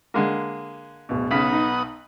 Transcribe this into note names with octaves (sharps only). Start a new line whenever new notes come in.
D3 G#3 A#3
D1 B2
B1 C#3 B3 F#5 D#6 B6
D#4